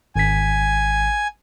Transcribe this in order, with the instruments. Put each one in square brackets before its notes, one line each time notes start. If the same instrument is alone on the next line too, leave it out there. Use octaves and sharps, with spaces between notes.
[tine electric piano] G#1 B6 [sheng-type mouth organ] G#5